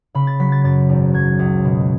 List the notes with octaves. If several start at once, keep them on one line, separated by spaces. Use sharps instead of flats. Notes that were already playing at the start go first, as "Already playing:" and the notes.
C#3 B5
A6
F#3 B6
A6
F#2 A6
G#1
F#3 G#6
C#2
B2